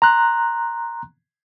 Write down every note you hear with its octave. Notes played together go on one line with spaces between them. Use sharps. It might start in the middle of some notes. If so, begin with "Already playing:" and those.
A#5 C6 F#6